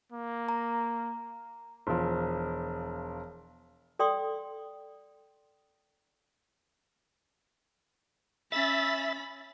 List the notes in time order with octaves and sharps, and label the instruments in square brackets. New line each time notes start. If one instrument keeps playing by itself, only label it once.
[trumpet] A#3
[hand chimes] A#5
[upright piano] E1 F3
[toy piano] A4 D5 G5 C6 D#6
[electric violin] C#4 B5 [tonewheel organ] E5 A6